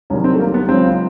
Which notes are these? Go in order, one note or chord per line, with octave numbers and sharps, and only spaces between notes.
C2 C3 D#3 F#3 C#4
C4
A3
A#3
B3
C#2 C#3 F#3 C4